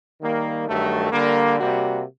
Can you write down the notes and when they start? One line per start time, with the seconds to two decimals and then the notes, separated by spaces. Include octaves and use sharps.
0.20 D#3 G3 A#3
0.67 G2 D#3 F#3 A3
1.11 D3 G3 A#3
1.58 C3 G3 A#3 F#4